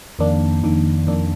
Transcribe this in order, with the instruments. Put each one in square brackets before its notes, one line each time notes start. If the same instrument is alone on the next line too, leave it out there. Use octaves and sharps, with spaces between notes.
[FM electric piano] F2 D#3 A#3 D4
F2 D#3 A#3 D4
F2 D#3 A#3 D4